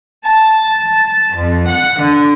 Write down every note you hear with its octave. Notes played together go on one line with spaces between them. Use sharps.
A5
A5
F2
F#5
D3